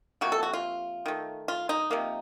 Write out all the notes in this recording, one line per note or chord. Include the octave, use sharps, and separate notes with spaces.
C3 F3 A#3 F#4
A4
F#4
F4
D#3 A3
F4
D#4
C3 F3 A#3